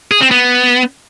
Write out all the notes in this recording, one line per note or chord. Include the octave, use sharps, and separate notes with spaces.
G#4
C4
B3